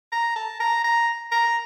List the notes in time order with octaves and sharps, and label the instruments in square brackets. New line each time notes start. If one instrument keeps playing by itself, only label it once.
[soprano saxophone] A#5
A5
A#5
A#5
A#5